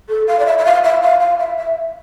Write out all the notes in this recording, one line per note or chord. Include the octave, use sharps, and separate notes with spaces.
A4
F5
D5
E5
E5
F5
E5
F5
F5
E5
E5